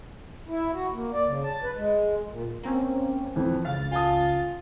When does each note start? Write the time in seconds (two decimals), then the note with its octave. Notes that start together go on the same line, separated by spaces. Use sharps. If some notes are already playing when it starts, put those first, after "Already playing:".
0.48 E4
0.73 F#4
0.93 A#3
1.13 D5
1.26 C#3
1.43 A5
1.63 B4
1.76 G#3
2.29 A#2
2.63 A#3 C4 C#4
3.36 F2 E3 F3
3.65 C#2 F5 A6
3.91 F4 G#5 A5 D#6